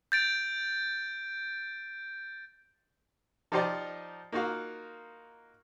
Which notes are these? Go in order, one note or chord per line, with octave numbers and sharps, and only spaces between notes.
G6 A6 D7
F3 D#4 G4 C5 D5 D#5
A#3 D#4 F4 F#4 F5